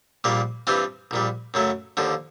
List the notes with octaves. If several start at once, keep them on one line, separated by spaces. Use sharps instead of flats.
A#1 A#2 G3 A#3
G2 E3 G3 C4 F4
A#1 A#2 G3
F#2 C#3 F#3 A3
D#2 D3 F3